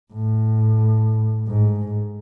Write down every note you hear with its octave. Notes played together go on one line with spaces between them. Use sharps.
A2
G#2